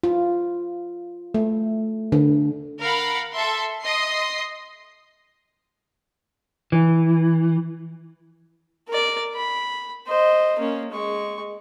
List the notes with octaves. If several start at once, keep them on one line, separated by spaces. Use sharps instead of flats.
F4
A3
D3
A#4 F5 F#5 B5
A4 E5 C6
D#5 C6 C7
E3
A#4 D5
B5
C5 D#5
A#3 C#4
G#3 C#6